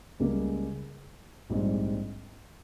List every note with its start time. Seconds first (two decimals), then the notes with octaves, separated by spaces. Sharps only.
0.20 C#2 C#3 G3 A#3
1.50 A#1 G#2 G3 C4